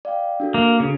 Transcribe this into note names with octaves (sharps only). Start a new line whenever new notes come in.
D5 F5 G5
D4 F#4 A4
A#3
C#3